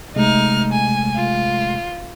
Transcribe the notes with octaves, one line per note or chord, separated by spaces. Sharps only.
C3 G#3 A3 D#4 F6
G#5
F4